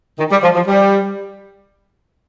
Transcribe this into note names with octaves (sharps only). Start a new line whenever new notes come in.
D#3
G3
F3
F3
G3